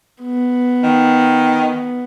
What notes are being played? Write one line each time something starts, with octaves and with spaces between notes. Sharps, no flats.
B3
D#3